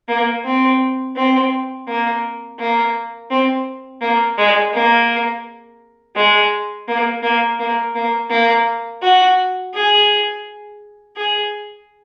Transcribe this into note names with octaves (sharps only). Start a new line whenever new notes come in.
A#3
C4
C4
A#3
A#3
C4
A#3
G#3
A#3
G#3
A#3
A#3
A#3
A#3
A#3
F#4
G#4
G#4